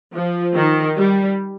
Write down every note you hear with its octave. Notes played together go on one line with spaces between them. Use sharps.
F3
D#3
G3